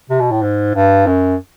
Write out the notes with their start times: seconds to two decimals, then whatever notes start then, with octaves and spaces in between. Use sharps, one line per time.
0.10 C3
0.20 B2
0.31 A2
0.42 G#2
0.75 G2
1.07 F#2